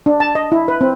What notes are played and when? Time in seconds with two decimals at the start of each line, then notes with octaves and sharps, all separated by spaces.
0.06 D4
0.20 A5
0.35 D#5
0.52 E4
0.68 B4
0.81 C4